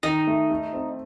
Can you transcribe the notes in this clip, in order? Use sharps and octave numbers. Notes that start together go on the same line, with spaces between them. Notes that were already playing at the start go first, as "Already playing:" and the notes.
D#3 D#4
A3
A3
C4